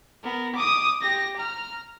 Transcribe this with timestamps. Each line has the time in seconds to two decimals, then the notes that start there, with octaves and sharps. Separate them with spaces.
0.24 B3 A#4
0.55 D6 D#6
1.01 G4 A#6
1.37 A#5 F6